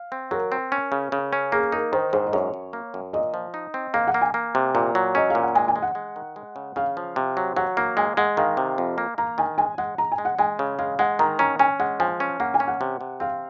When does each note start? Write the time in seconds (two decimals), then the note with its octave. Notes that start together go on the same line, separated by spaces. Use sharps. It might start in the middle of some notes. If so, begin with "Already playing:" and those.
Already playing: F5
0.12 C4
0.31 F#3 A#4
0.52 C4
0.72 C#4
0.92 C#3
1.12 C#3
1.33 C#4
1.52 A#3 G#4
1.72 D#4 A#4
1.92 D#3 C5
2.13 G#2 C5
2.27 D#5
2.33 F#2 C#5
2.54 F#2
2.73 A#3
2.94 F#2
3.13 A#2 D#5
3.34 F3
3.54 D#4
3.74 C4
3.94 A#3 F5
4.07 F#5
4.14 A#3
4.21 G#5
4.34 A#3
4.55 C3
4.75 A#2 A#5
4.95 F#3
5.15 C#4 D#5
5.30 A#2 F5
5.43 F#5
5.55 G#3 G#5
5.68 G#5
5.76 G#3
5.82 F#5
5.95 G#3
6.16 D#3
6.36 G#3
6.56 C#3
6.76 C#3 F5
6.97 F3
7.16 C3
7.37 F#3
7.57 F#3 F#5
7.77 A#3 A#5
7.97 G#3 G#5
8.17 G#3 F#5
8.37 D#3 F5
8.57 C3
8.78 F2
8.98 A#3
9.18 A#3 A#5
9.38 D#3 G#5
9.58 G#3 G#5
9.78 G#3 F#5
9.98 G#3 A#5
10.12 G#5
10.18 G#3
10.25 F#5
10.39 G#3 G#5
10.59 C#3
10.79 G#3 F5
10.99 G#3 F#5
11.19 D#3 A#5
11.39 C#4 A#5
11.59 C#4 G#5
11.80 G#3 F#5
12.00 F3 G#5
12.20 C#4
12.40 A#3 F#5
12.54 G#5
12.60 C#4
12.68 F#5
12.81 C3
13.01 C3
13.20 C4 F5